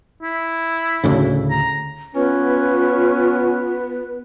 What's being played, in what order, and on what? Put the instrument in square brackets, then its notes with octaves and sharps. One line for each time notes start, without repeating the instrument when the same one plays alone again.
[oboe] E4
[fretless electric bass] D2 A2 C#3
[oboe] A#5
[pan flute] B3 [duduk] C#4 [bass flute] F4 [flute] B4